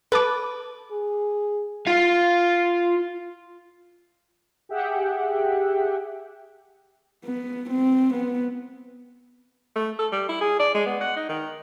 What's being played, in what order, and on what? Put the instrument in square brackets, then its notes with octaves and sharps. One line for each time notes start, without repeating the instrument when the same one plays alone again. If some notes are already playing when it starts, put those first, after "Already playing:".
[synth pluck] A4 A5 D6 [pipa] B4
[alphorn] G#4
[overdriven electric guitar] F4 F5
[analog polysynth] G4 G#4 E5 F#5 G5
[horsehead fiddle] B3
C4
B3
[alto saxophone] A3
A4
G3
E4
G#4
D5
G#3
B3
F#5
D#4
D#3